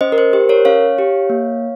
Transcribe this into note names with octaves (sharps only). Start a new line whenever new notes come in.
C#4 C5 D#5
A#4
C5
G4 C5
A#4 C#5
C#4 C#5 F5
G4
A#3